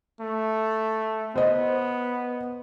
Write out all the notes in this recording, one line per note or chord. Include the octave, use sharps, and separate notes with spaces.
A3
B3 C5 D#5